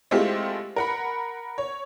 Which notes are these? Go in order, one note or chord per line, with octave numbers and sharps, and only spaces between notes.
G#3 A3 C4 E4 F4 G4
A#4 F#5 B5
C#5